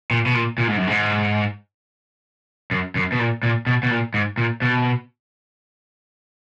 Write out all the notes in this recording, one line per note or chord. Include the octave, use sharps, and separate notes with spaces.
A#2
B2
A#2
A#2
G#2
F#2
G#2
F#2
F#2
B2
A#2
A#2
B2
B2
A#2
G#2
A#2
B2